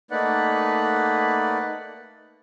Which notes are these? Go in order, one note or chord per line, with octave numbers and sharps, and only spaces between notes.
A3 A#3 D#4 B4 D5 F#5